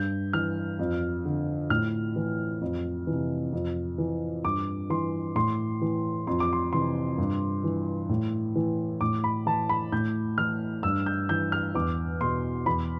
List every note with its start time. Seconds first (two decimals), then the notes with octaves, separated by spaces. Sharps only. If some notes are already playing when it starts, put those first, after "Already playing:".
Already playing: G2 G6
0.33 E3 F6
0.79 F2
1.25 D3
1.70 A2 F6
2.16 E3
2.61 F2
3.07 C3 E3
3.53 F2
3.98 E3
4.45 G2 D6
4.90 E3 C6
5.35 A2 C6
5.82 E3
6.27 F2 C6
6.40 D6
6.53 C6
6.73 C3 E3 C6
7.18 G2
7.64 E3
8.09 A2
8.56 E3
9.01 A2 D6
9.24 B5
9.46 E3 A5
9.69 B5
9.92 A2 G6
10.38 E3 F6
10.83 G2 E6
11.06 G6
11.29 E3 G6
11.52 F6
11.75 E2 D6
12.20 B2 C6
12.66 E2 B5